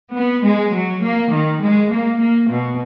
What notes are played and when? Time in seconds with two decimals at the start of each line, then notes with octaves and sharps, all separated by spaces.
0.14 B3
0.43 G#3
0.74 F#3
1.03 A#3
1.31 D#3
1.62 G#3
1.91 A#3
2.20 A#3
2.50 B2